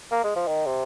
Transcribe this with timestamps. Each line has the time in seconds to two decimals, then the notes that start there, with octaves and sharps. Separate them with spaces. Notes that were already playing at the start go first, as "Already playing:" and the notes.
0.12 A#3
0.24 G#3
0.36 F3
0.47 D#3
0.67 C3